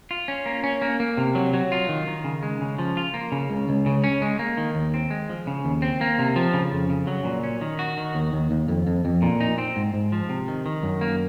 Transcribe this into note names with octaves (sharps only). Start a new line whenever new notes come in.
F4
C#4
A#3
C#4
A#3
A#3
C3
F#3
F#3
F4
D#3
D#3
C#3
G#3
C#3
F3
F4
A#3
C#3
C#2
C#2
C#3
C#4
G#3
A#3
D#3
D#2
C4
G#3
F3
C#3
D#2
C4
A#3
C3
F3
C#3
F2
C#3
F#3
A#2
C#4
D#3
F#4
D#3
D#2
D#2
D#2
F2
F2
F2
A#2
D#4
C4
G#2
G#2
F3
C3
D#3
D#3
F#2
A#3